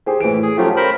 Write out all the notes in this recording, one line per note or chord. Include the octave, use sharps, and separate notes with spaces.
G4 G#4 C5
A2 E3 D7
G#4
F3 F#3 A3 C#4 F4 G4
A#4 C5 B5